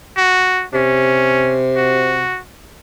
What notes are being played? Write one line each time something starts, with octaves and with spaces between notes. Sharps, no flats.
F#4
C3 C#4
F#4